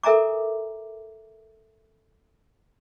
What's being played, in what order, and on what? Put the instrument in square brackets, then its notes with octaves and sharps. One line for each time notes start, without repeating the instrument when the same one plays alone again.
[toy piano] A4 A#4 E5 G#5 A#5 D6